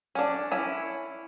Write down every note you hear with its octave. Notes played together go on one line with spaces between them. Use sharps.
C#4 D4
C#4 E4